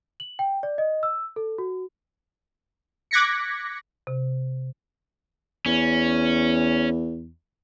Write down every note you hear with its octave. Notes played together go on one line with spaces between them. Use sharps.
F#7
G5
D5
D#5
E6
A4
F#4
D6 F#6 G#6 A#6 B6 C#7
C3
E2 C#4